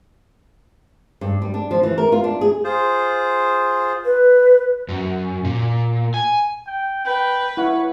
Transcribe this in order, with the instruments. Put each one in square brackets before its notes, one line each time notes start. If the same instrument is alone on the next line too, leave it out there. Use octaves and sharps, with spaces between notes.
[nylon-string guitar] G2
G3
D4
F3
E3
A#4
F4
D4
G#4
[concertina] F4 G#4 C5
[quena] B4
[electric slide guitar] F#2
A#2
G#5
[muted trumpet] G5
[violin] B4 [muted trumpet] G5
[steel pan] E4 F#5 [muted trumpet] C#5